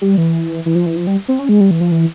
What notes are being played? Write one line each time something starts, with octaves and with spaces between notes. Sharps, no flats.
G3
E3
E3
F3
E3
F3
G3
C4
C#4
G#3
G3
E3
F3
E3